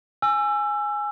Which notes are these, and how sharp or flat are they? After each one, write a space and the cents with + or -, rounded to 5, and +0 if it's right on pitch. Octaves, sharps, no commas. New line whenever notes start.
G#5 +0 E6 +25